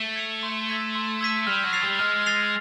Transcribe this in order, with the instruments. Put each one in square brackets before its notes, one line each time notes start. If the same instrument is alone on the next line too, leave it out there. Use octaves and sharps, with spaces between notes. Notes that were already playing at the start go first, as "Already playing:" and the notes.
Already playing: [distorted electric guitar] A3
[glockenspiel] G#6 C#7 F7
C6
E6 G#6 B6 D#7
C6
E6 G#6 B6 D#7
[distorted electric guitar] G3 [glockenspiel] F6
[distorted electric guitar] F#3
[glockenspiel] A6 C7 F7
[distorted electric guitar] G3
[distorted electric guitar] G#3 [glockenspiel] F6
[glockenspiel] A6 C7 F7